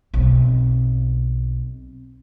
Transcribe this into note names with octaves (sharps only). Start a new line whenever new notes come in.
B1 C4